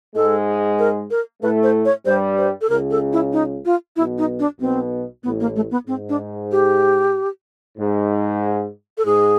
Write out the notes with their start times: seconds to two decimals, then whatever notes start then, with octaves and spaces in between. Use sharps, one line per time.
0.15 G#2 G#3 A4
0.79 A#4
1.11 A#4
1.43 A2 A3 B4
1.63 C5
1.85 C#5
2.06 G2 G3 C5
2.38 C5
2.61 A4
2.70 C#2 C#3 A#4
2.91 A4
3.13 E4
3.33 D#4
3.65 F4
3.96 B1 B2 E4
4.18 D#4
4.39 D4
4.60 B1 B2 C4
5.23 A1 A2 B3
5.40 A#3
5.56 A3
5.71 B3
5.87 G#2 C4
6.09 D4
6.52 G4
7.78 G#2
8.98 A4
9.06 G#2 G#4